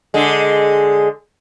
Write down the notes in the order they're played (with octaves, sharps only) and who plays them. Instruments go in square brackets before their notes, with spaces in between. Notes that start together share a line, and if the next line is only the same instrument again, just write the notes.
[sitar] D3 G#3